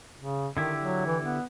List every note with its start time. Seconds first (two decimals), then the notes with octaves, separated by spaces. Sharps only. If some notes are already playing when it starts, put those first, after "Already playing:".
0.19 C#3
0.57 D3 D#3 E4 G4
0.81 F#3
1.07 E3
1.23 B3